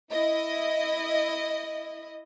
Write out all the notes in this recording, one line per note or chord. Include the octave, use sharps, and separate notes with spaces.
E4 D#5